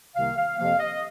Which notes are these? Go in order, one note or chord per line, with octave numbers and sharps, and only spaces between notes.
C2 C3 D#3 A#3 F5
F5
F2 C3 F3 A#3 F5
D#5